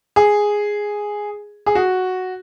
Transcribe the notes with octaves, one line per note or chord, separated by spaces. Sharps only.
G#4
G#4
F#4